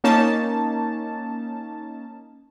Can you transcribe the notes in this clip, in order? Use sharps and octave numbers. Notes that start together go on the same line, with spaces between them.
A#3 C#4 D#4 A5